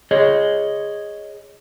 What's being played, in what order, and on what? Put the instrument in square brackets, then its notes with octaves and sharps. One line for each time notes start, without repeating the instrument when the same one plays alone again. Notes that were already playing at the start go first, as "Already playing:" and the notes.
[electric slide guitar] G#4 C#5 D#5